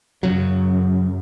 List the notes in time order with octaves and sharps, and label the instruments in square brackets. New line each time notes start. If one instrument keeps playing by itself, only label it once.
[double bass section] F#2 [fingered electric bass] C#3 F#3